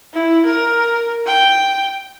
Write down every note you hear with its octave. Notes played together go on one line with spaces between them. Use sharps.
E4
A#4
G5